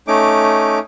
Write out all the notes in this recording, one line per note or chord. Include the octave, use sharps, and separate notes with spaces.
A3 C#4 D#4 D6